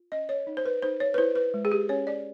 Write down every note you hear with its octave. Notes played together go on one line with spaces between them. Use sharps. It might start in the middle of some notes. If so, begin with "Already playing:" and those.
Already playing: F4
C#4 D#5
C#5
D#4
C5
B4
D#4 C5
C#5
B4
E4 C5
B4
G#3
G#4
G4
C#4 C#5
D5